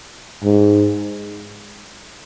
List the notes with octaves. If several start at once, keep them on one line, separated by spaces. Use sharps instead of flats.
G#2